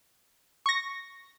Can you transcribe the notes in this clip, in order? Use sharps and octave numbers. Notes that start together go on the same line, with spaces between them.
C#6 A#6